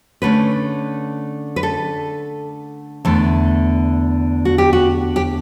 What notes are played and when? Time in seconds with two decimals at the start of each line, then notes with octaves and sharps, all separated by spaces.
0.22 D3 A3 C#4 B4
1.56 B4
1.63 A4
3.05 E2 D3 A3
4.45 F#4
4.58 G4
4.73 F#4
5.16 G4